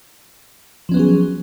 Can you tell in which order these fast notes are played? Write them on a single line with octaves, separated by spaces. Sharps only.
F3 C#4 B3 F#3 G#4